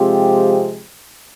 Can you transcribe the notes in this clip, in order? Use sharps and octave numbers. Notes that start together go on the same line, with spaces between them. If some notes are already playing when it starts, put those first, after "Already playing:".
Already playing: C3 F3 G#3 C4 F4 G4